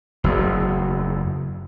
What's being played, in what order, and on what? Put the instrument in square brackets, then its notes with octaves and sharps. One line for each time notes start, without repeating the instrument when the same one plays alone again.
[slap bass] F#1 E2